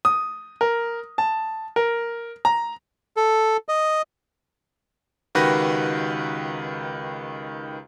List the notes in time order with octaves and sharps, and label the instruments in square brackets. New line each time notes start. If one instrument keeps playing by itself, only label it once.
[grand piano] D#6
A#4
A5
A#4
A#5
[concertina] A4
D#5
[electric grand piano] C#2 D#3 F#4 G4 B4 A#6